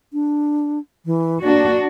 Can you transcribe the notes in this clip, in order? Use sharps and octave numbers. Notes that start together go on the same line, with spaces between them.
D4
E3
A#3 D4 F#4